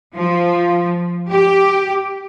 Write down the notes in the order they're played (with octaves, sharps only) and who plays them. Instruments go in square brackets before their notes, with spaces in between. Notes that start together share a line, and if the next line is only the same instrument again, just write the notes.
[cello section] F3
G4